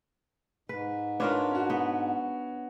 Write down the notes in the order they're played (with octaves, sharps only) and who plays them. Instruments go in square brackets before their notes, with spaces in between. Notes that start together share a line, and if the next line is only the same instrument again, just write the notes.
[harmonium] G#2 [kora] B4
[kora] D4 F4 A#4 [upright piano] B4 C#5
[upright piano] C#4 F#4
[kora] B3